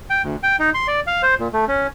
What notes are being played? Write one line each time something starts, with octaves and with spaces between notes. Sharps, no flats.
G5
D2
G5
D#4
C6
D5
F5
C5
A#2
A3
C#4